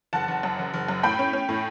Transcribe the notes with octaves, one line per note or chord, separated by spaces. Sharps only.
F#1 F#5 A5
F#1
F#2
F#1
F#1
F#2
A2 G5 B5
C#4
C#4
A2